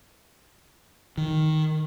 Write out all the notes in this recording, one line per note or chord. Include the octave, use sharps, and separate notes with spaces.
D#3